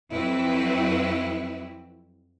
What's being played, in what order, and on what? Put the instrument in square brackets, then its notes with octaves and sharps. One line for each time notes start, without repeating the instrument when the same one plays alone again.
[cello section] F2 F#3 C4 E4 B4